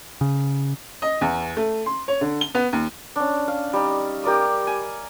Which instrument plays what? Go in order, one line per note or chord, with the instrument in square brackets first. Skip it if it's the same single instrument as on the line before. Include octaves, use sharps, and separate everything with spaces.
[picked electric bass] C#3
[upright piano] D#5
E2
A3
C6
C#5
D3
G7
B3
D#2
[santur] C#4 D4
F5
G3 D#4
G4 A#4 D5 D#6
G#5